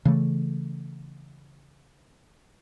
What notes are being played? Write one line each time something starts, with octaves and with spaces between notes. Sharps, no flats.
C#3 E3 A3